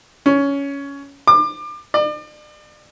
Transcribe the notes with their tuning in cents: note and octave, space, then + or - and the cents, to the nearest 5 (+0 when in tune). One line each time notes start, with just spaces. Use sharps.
C#4 +15
D6 +30
D5 +40